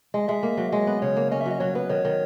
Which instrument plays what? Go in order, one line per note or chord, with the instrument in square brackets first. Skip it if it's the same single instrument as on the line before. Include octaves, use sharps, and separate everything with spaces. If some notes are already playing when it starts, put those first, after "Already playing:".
[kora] G#3 [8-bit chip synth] D#5
[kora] G#3 [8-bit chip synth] E5
[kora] A#3
F#3
[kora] G#3 [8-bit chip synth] D#5
[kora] B3
[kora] C#3 [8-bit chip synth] C#5
[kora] A#3
[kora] C#4 [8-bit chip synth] D#5
[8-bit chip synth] E5
[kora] F#3
[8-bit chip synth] D#5
[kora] F#3 [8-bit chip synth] C#5
[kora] B3 [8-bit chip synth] B4
[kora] D#3 [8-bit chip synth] C#5
[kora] D#3